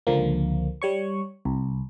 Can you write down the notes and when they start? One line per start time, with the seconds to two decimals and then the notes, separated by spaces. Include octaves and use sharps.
0.07 C#2 D3 F3 A#3
0.82 G3 C#5 C#6
1.45 C2